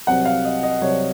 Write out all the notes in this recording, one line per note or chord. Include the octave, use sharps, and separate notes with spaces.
C2 C3 F#3 C4 F#5
F5
D#5
D#5
C2 C3 F#3 C4 C#5